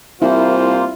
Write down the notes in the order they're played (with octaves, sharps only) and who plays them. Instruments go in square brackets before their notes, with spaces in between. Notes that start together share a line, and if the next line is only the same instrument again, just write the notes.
[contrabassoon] C2 [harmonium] A#3 C5 [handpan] E4 [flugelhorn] F4